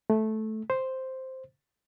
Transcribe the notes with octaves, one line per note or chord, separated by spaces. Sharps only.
A3
C5